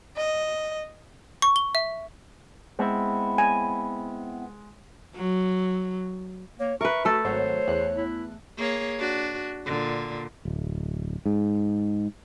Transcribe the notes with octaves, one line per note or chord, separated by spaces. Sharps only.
D#5
C#6
G7
E5
G#3 B3 C4 E4
G#5
F#3
A#3 C#5
A#4 B4 E5 C#6
A3 F#4 A4
G#1 F#3 C5 C#5
E2 F#6
E4
A#3 G#4 C#5
D4 F#4
A#2 D3
D1
G#2